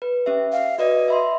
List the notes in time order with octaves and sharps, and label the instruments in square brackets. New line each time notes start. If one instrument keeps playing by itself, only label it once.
[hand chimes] B4
C#4 G4 E5
[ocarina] F5
[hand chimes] F#4 B4 D5 [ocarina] D#5
[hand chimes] E5 B5 C6